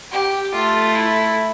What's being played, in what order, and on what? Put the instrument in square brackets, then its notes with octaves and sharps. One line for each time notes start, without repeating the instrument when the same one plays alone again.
[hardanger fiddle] G4
[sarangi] A3 [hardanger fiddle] F4
[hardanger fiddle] E4